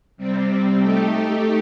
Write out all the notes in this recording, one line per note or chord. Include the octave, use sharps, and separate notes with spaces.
C3 G3 C4
A3 D#4 G4